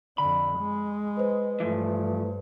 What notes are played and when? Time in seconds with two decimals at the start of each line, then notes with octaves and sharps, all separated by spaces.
0.18 F2 D3 B5
0.59 G#3
1.17 B4 C5 D#5
1.60 G2 E3 F3 A3